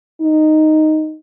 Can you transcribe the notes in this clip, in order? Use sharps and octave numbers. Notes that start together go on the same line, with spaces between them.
D#4